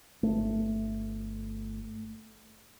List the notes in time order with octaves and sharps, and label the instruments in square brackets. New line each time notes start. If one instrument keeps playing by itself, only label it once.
[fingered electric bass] G1 A3